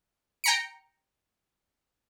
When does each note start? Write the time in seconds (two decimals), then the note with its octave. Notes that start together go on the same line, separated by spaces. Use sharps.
0.44 G5 A#5 C#7